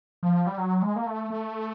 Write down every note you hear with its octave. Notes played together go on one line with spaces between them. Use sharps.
F3
G3
F#3
G#3
A#3
A3
A3